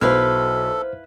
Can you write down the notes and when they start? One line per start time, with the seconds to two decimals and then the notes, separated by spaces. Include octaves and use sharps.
0.01 B1 F#3 E4 A4 B4 C5 F5 F6